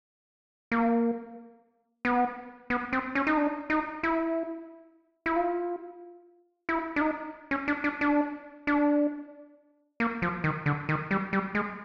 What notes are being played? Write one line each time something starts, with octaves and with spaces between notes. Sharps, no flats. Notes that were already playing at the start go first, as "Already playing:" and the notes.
A#3
B3
B3
C4
C#4
D#4
D4
D#4
E4
E4
F4
E4
D4
D#4
C#4
D4
D4
D4
D4
A#3
F3
D#3
D3
D#3
G3
G3
G#3